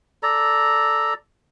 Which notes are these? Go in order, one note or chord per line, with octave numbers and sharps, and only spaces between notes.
A4 D5 A#5